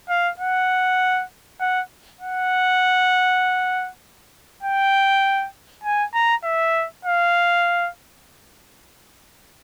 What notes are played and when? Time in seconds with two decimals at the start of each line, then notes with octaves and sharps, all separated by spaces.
0.09 F5
0.39 F#5
1.60 F#5
2.21 F#5
4.63 G5
5.84 G#5
6.14 A#5
6.44 E5
7.05 F5